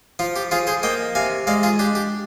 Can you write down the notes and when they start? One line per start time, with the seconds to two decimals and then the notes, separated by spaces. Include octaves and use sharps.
0.19 F3 F4
0.36 G4
0.51 F3 F4 G#4
0.67 G#4 C5
0.83 A#3 D#5 G5
1.15 C3 F5 G#5
1.47 G#3 D5 F5
1.63 F4 G#4
1.79 D4 G4
1.95 G4